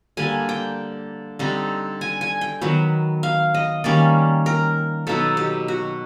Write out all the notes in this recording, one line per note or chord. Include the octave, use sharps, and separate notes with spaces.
D3 G3 A#3 G#5
G5
D3 G3 C4 D#4
G#5
G#5
G5
D#3 F#3 B3
F5
D#5
D#3 G3 A#3 C#4 D5
A#4
B2 F#3 B3 D#4 A4
G4
F#4